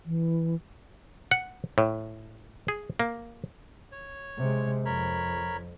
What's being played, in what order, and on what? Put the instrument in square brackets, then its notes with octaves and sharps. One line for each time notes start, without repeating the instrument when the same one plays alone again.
[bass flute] E3
[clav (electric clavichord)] F#5
A2
G#4
A#3
[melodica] C#5
[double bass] C3 G#3
[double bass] F2 [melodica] A#4 C#5 B5